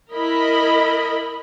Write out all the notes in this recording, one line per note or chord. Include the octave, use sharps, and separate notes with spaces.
E4 A#4 D#5 B5